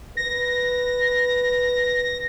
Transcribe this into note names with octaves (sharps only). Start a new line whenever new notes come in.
B4 A#6